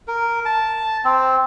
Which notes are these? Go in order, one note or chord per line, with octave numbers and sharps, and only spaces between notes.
A#4
A5
C4